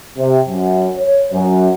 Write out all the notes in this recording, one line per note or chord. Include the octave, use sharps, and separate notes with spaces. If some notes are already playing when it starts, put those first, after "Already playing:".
C3
F#2
C#5
F#2